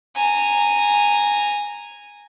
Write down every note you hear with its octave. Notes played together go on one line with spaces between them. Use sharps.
G#5 A#5